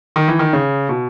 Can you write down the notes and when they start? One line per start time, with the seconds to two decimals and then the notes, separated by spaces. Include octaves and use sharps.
0.16 D#3
0.28 E3
0.39 D#3
0.53 C#3
0.89 B2